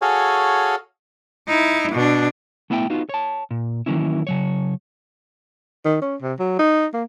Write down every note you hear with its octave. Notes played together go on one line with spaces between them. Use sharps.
F#4 G#4 A4 C#5 F5 G#5
D#4 E4
B2 D4
A3 B3 E4 E5 F#5 G5
B3 D#4 F4 F#4
C#5 A5
A#2
D#3 E3 F#3 A#3 C#4 E4
C#3 F#3 C#5
D#3
C#4
C3
F#3
D#4
A#3